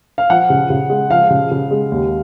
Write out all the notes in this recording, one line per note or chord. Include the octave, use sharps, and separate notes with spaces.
F5
F3 F#5
C#3
C#3
G#3
F3 F5
C#3
C#3
G#3
D#2